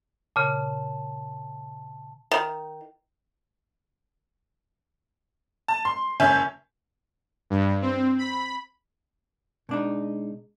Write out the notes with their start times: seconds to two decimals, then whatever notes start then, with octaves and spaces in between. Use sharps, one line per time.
0.36 A#2 C#3 A5
2.31 D#3
5.68 A5
5.85 C6
6.20 F#1 C#4 E5 G#5 G6
7.50 G2
7.82 C4
8.18 B5
9.69 B2 G#3 D4 D#4